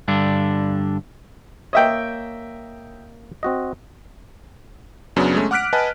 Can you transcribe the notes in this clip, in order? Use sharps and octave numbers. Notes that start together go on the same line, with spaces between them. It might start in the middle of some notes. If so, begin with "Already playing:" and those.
G2 D3 D4
A#3 C#5 D#5 E5 G5
C4 F#4 D#5
F#2 C#3 F#3 B3 D4
G#3 A3 C#4
F#5 D6 F6 F#6 B6 D7
B4 D#5 F#5 G#5 A5